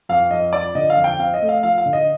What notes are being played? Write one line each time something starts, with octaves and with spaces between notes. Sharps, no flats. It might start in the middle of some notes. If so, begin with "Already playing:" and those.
F2 F5
F2 D#5
F3 D5
D3 D#5
F5
F2
G5
C4 F5
D#5
A3
F5
F3 F5
F5
D3
D#5